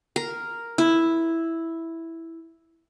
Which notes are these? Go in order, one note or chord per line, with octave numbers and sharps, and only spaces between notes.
A#4
E4